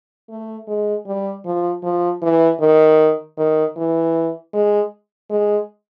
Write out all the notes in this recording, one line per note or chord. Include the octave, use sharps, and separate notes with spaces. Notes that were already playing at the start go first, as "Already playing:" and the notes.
A3
G#3
G3
F3
F3
E3
D#3
D#3
E3
G#3
G#3